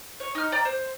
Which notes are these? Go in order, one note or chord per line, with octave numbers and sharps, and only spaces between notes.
C#5
D#4 F6
D5 G5 A#5 F6
C5